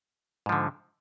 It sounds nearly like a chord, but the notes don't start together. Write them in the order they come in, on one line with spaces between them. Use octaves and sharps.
G#2 F3 D3